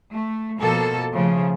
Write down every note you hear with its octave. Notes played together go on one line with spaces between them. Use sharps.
A3
B2 F3 A#3 A4
C#3 F3 A3